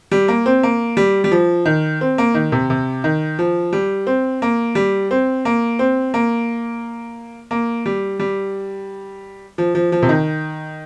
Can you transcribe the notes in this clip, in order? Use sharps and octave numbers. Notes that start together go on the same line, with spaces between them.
G3
A#3
C4
A#3
G3
G3
F3
D#3
C4
A#3
D#3
C3
C3
D#3
F3
G3
C4
A#3
G3
C4
A#3
C4
A#3
A#3
G3
G3
F3
F3
F3
C3
D#3